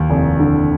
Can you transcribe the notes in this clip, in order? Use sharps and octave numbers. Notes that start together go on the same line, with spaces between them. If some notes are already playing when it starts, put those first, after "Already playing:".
Already playing: D#2
F1
D3